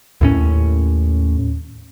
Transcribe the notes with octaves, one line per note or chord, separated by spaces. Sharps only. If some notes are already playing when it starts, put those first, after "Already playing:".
D#2 A2 C#4